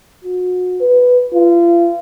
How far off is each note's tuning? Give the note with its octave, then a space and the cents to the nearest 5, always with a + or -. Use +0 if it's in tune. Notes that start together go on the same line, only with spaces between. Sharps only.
F#4 -30
B4 +5
F4 -35